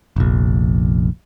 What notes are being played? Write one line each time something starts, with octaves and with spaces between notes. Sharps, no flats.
F1 A#1